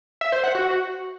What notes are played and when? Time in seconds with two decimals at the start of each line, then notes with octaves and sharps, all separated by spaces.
0.21 E5
0.32 C5
0.44 F#5
0.55 F#4